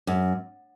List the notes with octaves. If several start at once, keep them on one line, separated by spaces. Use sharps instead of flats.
F#2